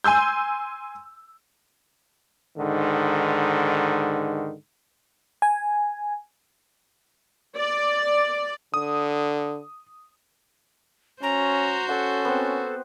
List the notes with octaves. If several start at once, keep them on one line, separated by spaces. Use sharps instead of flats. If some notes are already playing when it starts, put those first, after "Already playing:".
G#5 C6 E6 G6
G#2 D3 D#3
G#5
D5
D3 D#6
C#4 F#4 C5 A#5
C#4 A4 F#5
B3 C4